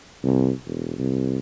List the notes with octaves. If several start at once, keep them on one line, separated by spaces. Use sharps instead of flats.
C2
E1
C2